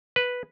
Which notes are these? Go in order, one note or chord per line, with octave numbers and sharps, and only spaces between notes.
B4